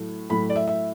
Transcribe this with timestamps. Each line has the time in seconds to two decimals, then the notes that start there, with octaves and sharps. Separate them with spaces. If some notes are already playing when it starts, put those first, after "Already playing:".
Already playing: A2 F#3 A3
0.30 A2 F#3 A3 B5
0.50 D5
0.56 E5
0.67 E5